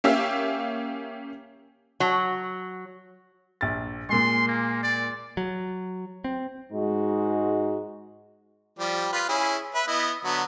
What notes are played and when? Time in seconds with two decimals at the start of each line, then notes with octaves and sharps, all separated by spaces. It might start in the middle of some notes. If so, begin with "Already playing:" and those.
0.04 A#3 C#4 G4 E5 F5
2.00 F#3
3.61 A#1 A6
4.09 A#2 G#3 C6
4.47 A#3
4.83 D5
5.37 F#3
6.24 C4
6.72 G#2 G#3 D#4 F#4
8.79 F3 G3 D5
9.12 F4 B4
9.29 C#4 E4 G#4
9.75 B4 E5
9.87 B3 E4 D#5
10.24 D3 F#3 B3